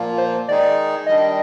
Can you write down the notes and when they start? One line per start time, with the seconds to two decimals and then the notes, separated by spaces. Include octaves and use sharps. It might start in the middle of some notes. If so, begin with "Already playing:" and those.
Already playing: A#2 F3 A#3 F4
0.18 C5
0.48 D#3 G#3 D#4 G#4 D5
1.07 D#3 G3 D4 D#5